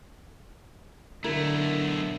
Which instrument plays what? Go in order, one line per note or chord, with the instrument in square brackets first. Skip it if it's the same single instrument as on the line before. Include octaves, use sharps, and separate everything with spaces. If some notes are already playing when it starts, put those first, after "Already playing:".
[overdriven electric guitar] B1 A3 [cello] D3 [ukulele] E4 A#4